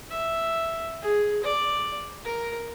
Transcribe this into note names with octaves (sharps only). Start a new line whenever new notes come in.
E5
G#4
D5
A#4